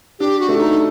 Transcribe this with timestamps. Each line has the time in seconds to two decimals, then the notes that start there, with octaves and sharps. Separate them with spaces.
0.20 D4 G4
0.40 F#4
0.49 A3
0.58 D#4